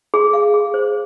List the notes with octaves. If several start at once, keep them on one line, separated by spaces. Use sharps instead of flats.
G#4
F5
G#4
C5